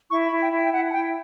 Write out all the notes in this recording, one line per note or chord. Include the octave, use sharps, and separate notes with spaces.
E4 C#6
B5
E4
G5
E4
G5
E4 F#5
A5
E4 G5